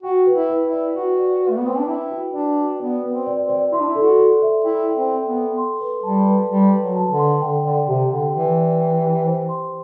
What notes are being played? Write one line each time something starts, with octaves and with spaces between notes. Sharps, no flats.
F#4 G5
B4
E4
B4
E4
D5
F#4 B4
D5
B4
A3
B3
C4 B4
D4
E4 G5
F#4
D4 D5
F#4
B3 D5
B4
C4
D5
C4
D5
E4 C6
D4
E4
A4
F#4
A4
E5
E4 G5
G5
C4
G5
B3
A4
C6
B4
G3 A5
B4
G3 B4
B4
F#3
A5
D3
C6
D3 G5
D3 D5
C3 G4
D3 G5
E3 G4
D5
G5
G4
C5
C6